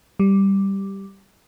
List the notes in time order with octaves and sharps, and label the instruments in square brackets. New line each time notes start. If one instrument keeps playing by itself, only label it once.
[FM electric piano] G3